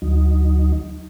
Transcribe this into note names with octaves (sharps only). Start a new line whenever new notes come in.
D2 F#3 D#4